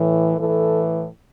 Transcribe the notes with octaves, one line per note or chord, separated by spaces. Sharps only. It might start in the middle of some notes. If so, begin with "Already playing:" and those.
Already playing: A2 E3
A2 E3 A4